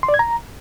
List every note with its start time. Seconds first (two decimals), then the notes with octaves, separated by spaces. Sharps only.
0.03 C6
0.09 D5
0.14 G#6
0.19 A#5